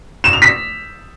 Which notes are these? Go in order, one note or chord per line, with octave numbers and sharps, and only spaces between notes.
E7
F7
B6